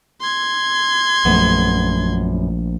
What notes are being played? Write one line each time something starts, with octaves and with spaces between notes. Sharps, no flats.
C6 G#6
A#1 F#2 F3 A3 B3